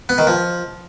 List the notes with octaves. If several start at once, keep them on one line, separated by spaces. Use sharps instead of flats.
B3
D#3
F3